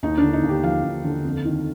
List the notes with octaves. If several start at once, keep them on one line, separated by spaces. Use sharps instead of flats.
D#2 D#4
D4
D3
D#4
D#2 G4
F3 F5
D#2
D3
F2
D#3